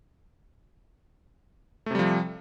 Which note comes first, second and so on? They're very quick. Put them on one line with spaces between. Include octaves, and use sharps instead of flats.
A3 C3 G3 F3